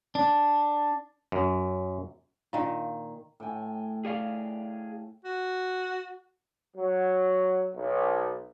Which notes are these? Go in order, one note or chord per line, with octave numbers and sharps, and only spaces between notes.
D4
F#2
A#2 D#3
A2 G5 G#5
G#4 D5 F5
F#4
F#3
B1